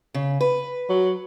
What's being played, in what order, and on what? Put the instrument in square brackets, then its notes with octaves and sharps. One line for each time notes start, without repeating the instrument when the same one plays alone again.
[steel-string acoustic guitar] C#3
B4
[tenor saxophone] F#3